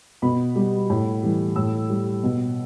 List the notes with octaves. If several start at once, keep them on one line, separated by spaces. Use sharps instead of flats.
B2 B5
G3
A2
E3 G3
A2 E6
G3
B2